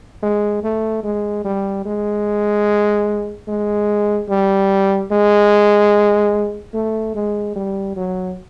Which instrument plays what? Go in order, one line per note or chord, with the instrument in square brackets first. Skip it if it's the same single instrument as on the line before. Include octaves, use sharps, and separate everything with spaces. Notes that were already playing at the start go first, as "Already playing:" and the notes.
[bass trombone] G#3
A3
G#3
G3
G#3
G#3
G3
G#3
A3
G#3
G3
F#3